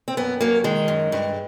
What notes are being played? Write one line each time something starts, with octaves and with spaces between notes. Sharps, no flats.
C4
F#2 B3
F#3 A#3
D#3 G#3
F#2
G2